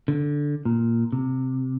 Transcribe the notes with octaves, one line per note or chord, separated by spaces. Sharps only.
D3
A#2
C3